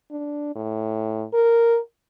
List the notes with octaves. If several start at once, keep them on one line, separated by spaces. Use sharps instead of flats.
D4
A2
A#4